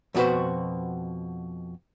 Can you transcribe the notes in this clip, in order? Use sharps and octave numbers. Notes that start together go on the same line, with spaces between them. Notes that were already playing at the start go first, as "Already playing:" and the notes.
F2 B2 F#4 B4 C5